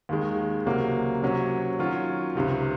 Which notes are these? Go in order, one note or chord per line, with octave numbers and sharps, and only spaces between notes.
D#2 D#3 G#3
C#2 C3 F#3 A#3
C3 F#3 C#4
D#3 F#3 C#4 F4
C#2 C3 D#3